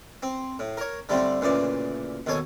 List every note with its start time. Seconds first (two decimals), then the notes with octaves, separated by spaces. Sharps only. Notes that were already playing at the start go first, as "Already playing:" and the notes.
0.23 C4
0.59 A2
0.77 A#4 C#5
1.09 D3 G3 A3 C4
1.41 D2 A#2 C#3 E3 D5
2.26 D#2 B2 A4 C#5 G#5